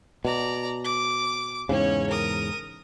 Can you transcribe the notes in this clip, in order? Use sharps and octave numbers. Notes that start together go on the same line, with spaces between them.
B2 D5 A#5
D6
E2 G#2 C#3 C#4 C#5
A#4 D#6